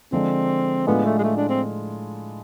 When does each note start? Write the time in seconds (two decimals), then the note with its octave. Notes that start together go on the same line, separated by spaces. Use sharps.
0.12 D3 F3 G#3 C4
0.87 A2 G#3 B3 D4 F4
1.05 A3
1.19 G#3
1.24 A3
1.37 D4
1.49 C4